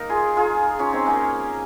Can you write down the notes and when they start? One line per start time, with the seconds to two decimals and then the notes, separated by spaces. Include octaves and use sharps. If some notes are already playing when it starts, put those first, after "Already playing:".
Already playing: A#3 D#4 A#4
0.09 F4 G#4
0.37 F4 G#4
0.79 C#4 F4
0.93 C4 D#4
1.06 A#3 C#4